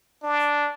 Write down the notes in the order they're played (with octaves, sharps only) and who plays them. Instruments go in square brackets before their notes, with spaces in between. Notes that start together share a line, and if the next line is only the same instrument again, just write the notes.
[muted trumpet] D4